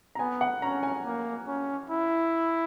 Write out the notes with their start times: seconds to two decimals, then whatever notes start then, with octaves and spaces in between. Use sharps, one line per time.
0.15 A#5
0.19 B3 G#5
0.41 F#5
0.62 C#4 A#5
0.83 G#5
1.05 A#3
1.47 C#4
1.90 E4